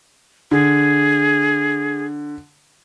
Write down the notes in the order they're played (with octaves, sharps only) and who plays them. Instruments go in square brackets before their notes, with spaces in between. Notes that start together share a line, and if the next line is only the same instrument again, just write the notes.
[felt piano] D3 [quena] G#4